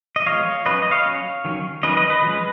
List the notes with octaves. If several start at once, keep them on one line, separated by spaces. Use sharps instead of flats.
D#5
F3 G#3 B3 C#5 F5
F#3 C#4 B4 D#5
D#5
C#5 F5
F#3 C#4
D#3 F#3 C#4
D#3 F#3 C#4 B4 D#5
B4 D#5
B4 D#5
F3 G#3 C#4